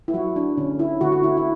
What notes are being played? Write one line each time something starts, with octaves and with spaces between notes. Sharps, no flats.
E4
F#3 F#4
D4
D3 C#4
E4
D3 F#4
F#4
E4
E4